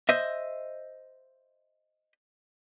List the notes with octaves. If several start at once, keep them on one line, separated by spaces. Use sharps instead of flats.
C5 D#5 E5